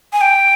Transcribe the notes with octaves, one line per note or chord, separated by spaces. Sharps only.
G#5
G5